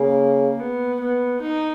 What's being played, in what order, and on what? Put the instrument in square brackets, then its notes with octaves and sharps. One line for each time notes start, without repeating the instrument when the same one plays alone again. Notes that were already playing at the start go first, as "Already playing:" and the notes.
Already playing: [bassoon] C#3 [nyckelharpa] A#3
[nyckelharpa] B3
B3
D#4